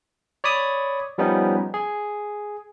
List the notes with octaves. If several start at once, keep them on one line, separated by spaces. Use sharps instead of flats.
C#5 D5 B5 D#6
F3 G3 B3 C#4 D#4
G#4